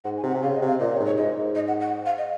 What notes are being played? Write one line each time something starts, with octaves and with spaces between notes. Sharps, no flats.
G#2 F#5
G#5
C3
F#5
C3
C#3 F5
D#5
C3
F5
A#2 D#5
C#5
G#2
C#5
G#2 D#5
G#2
D#5
F#5
F#5
F5
D#5